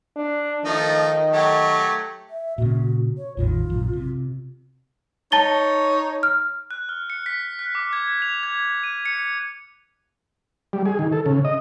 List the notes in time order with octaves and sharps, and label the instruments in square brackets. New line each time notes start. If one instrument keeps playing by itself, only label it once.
[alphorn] D4
[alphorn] D#3 [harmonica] F3 A3 D#4
[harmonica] F#3 A3 G4
[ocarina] E5
[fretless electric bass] A#2 C#3 [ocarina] F#4
[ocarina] C#5
[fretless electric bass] A1 E2 D#3 [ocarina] F4
[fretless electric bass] A#1 F#2
C3
[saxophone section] D#4 C#5 [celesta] A5 A6 G7
[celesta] F6
[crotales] F#6
F6
C#7
B6
F#6
D6
G#6
F7
G#6
D#7
C#7
[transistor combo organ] G3
G#4
D#3
A4
C#3
D#5